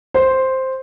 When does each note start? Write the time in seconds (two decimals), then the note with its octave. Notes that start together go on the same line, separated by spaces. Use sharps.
0.14 C5